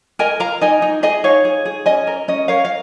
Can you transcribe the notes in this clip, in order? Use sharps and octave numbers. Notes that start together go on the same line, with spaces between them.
A#4 D#5 G#5
A#4 F5 A#5
D#4 D#5 G#5
D#4
G#4 D#5 G#5
D#4 C#5 F5
G#4
G#4
C#4 D#5 G#5
A#4
C#4 D#5
A#4 C#5 F5
F5